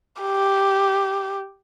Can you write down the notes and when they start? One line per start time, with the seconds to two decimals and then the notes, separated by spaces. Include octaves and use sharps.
0.22 G4